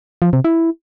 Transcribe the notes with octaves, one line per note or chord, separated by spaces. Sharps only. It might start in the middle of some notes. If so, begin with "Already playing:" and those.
F3
C3
E4